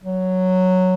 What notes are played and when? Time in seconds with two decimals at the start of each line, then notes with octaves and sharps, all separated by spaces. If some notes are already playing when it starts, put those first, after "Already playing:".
0.03 F#3